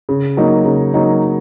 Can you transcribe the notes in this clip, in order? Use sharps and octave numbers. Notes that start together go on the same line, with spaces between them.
C#3
F#3 A#3 D#4
C#3
F#3 A#3 D#4